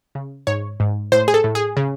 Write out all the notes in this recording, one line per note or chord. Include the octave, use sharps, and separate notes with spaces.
C#3
G#2 C#5
G#2
A2 C5
G#4
A4
A2
G#4
C#3